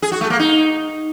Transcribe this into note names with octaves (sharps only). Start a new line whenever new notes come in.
G#4
F#4
A3
A#3
D#4